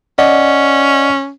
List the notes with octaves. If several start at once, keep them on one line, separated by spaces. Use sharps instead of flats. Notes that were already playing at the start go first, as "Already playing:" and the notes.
C#4 D5 D#5 F#5